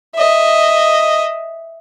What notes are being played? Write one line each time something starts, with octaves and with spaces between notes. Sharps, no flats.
D#5 E5